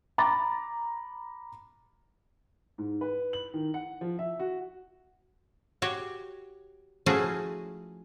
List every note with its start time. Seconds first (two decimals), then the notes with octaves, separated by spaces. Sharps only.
0.18 A#5 B5 D6 A6
2.78 G#2
3.01 B4
3.33 F#7
3.54 D#3
3.74 F#5
4.01 F3
4.19 E5
4.40 F#4
5.82 F#4 G4 C#5
7.06 F3 A3 C#4 E4 F#4 G#4